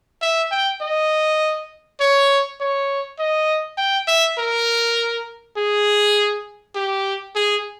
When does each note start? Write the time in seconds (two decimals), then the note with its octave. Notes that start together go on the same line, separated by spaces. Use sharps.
0.22 E5
0.51 G5
0.81 D#5
2.00 C#5
2.60 C#5
3.19 D#5
3.78 G5
4.07 E5
4.38 A#4
5.57 G#4
6.75 G4
7.35 G#4